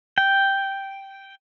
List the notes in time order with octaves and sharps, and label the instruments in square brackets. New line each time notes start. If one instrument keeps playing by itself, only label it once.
[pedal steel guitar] G5